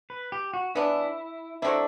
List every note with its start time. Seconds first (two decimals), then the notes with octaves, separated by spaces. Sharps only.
0.10 B4
0.32 G4
0.54 F#4
0.75 E3 B3 D4 E4
1.62 F#3 A3 C4 D4 E4